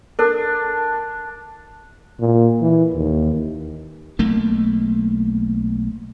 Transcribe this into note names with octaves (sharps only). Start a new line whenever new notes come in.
D4 A4 A#4
A#2
E3
D#2
B1 A3 A#3